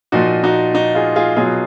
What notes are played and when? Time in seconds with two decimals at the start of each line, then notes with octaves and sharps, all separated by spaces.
0.12 A#2 F3 D#4 F#4
0.44 D#4 F#4
0.74 D#4 F#4
0.95 F4 G#4
1.16 F4 G#4
1.37 B2 F#3 F4 G#4